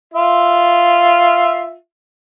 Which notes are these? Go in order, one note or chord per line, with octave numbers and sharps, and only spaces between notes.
F4 E5